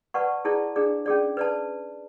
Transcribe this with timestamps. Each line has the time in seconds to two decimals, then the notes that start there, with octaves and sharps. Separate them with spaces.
0.14 B4 D5 F#5 A5 C#6
0.45 E4 G#4 D5 A5
0.76 D4 G#4 D5
1.06 C#4 G#4 D5
1.37 B4 D5 A5